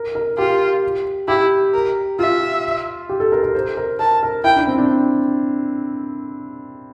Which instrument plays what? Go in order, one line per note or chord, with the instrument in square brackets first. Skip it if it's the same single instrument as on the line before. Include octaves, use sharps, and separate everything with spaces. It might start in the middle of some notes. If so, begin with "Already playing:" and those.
Already playing: [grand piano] A#4
A#4
[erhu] F4 [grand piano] G4
[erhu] E4 [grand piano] G4
[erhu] A#4
[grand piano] F4 [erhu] E5
[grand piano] G4
A4
A#4
A#4
C5
A#4
[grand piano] A#4 [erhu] A5
[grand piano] A#4
[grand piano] E4 [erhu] G5
[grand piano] D4
C4
D4